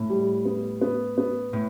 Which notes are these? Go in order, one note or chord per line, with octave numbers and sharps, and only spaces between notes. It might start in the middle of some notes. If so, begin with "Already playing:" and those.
Already playing: A2
G3
B3
B3
B3
A2